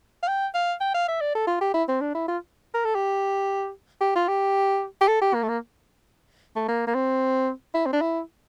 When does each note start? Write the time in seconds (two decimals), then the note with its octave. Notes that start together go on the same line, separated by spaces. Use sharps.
0.23 F5
0.28 G5
0.55 F5
0.81 G5
0.94 F5
1.08 E5
1.21 D5
1.35 A4
1.47 F4
1.61 G4
1.74 E4
1.88 C4
2.01 D4
2.15 E4
2.28 F4
2.74 A#4
2.85 A4
2.95 G4
4.01 G4
4.16 F4
4.28 G4
5.01 G4
5.08 A4
5.22 G4
5.34 A#3
5.43 A3
5.49 A#3
6.56 A3
6.68 A#3
6.87 A#3
6.95 C4
7.74 E4
7.86 C4
7.93 D4
8.01 E4